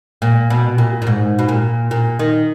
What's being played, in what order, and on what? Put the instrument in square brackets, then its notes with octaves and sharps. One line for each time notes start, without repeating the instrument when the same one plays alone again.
[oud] A#2
B2
A#2
A#2
G#2
B2
A#2
A#2
D#3